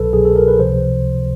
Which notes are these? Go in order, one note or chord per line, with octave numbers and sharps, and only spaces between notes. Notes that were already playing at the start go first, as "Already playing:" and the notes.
Already playing: C2 B2 F#3 A4 B4
C2 B2 F#3 G#4
A4
A#4
B4
C#2 C3 F3 C5